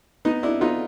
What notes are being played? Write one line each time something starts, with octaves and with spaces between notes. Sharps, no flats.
B3 D#4
D4 E4
B3 D#4 F4